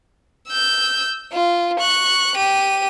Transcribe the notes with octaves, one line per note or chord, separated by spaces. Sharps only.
E6 G6
F4
C#6 F#6
G4 D#7